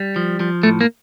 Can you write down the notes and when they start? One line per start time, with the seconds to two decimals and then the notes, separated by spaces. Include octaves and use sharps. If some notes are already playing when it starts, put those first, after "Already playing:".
Already playing: G3
0.16 F3
0.40 F3
0.63 A2 A3
0.81 A#3